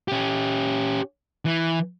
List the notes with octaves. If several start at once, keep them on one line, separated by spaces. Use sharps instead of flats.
C#4 G4
E3